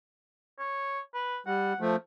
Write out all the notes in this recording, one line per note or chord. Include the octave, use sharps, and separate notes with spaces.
C#5
B4
G3 F#5
F3 A3